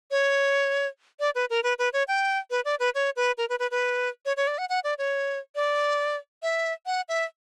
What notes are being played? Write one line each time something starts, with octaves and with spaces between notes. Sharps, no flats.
C#5
D5
B4
A#4
B4
B4
C#5
G5
B4
D5
B4
C#5
B4
A#4
B4
B4
B4
C#5
C#5
D5
F#5
F#5
D5
C#5
D5
E5
F#5
E5